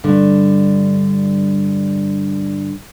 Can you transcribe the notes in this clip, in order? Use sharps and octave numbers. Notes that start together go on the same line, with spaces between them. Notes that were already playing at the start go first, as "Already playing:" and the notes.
G2 D3